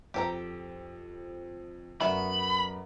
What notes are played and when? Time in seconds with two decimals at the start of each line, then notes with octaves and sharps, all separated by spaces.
0.14 F2 G4 A4 C5 A#5
2.01 F#2 A3 B3 D5 E5 B5